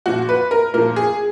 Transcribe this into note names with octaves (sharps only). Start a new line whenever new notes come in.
A#2 F3 F#4
B4
A#4
A#2 F3 A#4
G#4